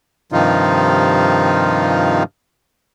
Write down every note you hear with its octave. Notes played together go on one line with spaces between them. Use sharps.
G2 C3 D#3 F3 D#4 F4